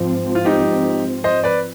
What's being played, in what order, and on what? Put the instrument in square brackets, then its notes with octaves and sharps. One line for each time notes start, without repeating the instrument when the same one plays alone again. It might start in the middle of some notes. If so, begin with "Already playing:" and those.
Already playing: [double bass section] G#2 F3 C4
[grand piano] F4
D#4 G4
C5 D#5
B4 D5